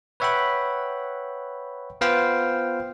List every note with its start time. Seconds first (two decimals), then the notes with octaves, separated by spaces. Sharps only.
0.20 B4 C#5 E5 F#5 G5 B5
2.01 B3 F4 B4 C5 F5 G5